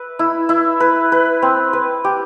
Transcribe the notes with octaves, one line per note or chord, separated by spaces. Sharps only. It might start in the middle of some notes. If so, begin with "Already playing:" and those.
Already playing: B4 E5
E4
E4
B4
B4
C4
B4
G4